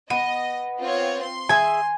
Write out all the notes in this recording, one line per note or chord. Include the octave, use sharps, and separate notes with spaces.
B3 D#5 D#7
C4 F4 C#5
C6
G#4 E5 G#5